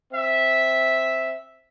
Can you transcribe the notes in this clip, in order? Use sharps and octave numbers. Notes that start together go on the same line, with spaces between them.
C4 E5